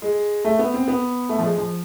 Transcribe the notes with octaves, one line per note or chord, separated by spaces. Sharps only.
G#3
A3
B3
C4
B3
A3
F3
G#3
F3